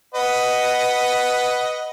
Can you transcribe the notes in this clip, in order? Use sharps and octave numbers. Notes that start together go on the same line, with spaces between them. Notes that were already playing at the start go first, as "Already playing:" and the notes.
B4 D#5 F#5